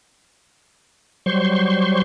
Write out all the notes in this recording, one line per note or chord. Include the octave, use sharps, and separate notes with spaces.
F#3 G3 C5 C6 C#6